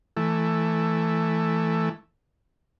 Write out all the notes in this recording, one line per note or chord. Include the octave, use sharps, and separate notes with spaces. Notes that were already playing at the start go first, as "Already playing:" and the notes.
E3 A3